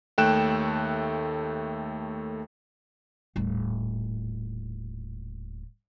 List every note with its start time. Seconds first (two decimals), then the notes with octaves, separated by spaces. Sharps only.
0.18 D#2 A3 G5 F#6 E7
3.36 D#1 A2